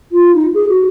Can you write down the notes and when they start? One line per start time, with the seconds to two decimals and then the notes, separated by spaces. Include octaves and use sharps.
0.12 F4
0.35 D#4
0.54 G#4
0.69 F#4